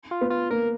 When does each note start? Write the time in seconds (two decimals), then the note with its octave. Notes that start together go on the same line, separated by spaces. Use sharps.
0.11 F4
0.21 B3
0.30 F4
0.51 A#3 A#4